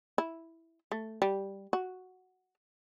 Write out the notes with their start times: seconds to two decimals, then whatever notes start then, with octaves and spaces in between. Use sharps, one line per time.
0.18 E4
0.92 A3
1.22 G3
1.73 F#4